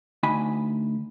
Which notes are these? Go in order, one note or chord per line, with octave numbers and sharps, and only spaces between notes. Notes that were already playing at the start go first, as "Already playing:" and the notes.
D2 D#4 G#5 B5